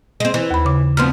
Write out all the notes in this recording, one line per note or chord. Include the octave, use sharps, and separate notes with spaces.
G#3 C4
E3
D#2 B5
C#3 D6
D2 F3 B3 C4 C6 F6